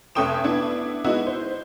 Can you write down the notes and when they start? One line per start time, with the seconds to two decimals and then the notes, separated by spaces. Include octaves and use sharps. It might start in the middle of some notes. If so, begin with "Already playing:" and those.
0.15 F1 C#4 A4 G5 D#6 E7
0.44 B3 D4 E4 G#6
1.04 G#3 B3 D#4 E4 F#4
1.27 C5